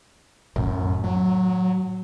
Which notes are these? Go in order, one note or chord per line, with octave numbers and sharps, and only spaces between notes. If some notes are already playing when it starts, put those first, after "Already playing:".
F#2 A2 D#3
F#3